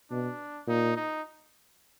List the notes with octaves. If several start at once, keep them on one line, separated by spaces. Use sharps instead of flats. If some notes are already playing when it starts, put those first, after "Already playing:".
B2 D4
A#2 D#4
D#4